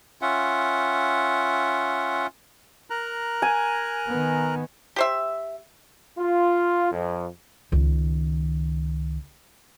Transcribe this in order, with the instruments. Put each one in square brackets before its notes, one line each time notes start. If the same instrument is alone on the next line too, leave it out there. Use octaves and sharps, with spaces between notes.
[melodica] C#4 F4 E5 F#5
[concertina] A#4 A#5 F#6
[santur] G#5
[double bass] D#3 B3
[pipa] G4 C5 E5
[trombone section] F4
F2
[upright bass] C#2 D#3